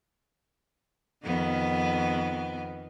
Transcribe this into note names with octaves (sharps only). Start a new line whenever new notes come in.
F2 D#3 B3